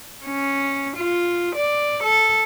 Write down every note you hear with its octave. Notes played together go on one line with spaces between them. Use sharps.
C#4
F4
D5
A4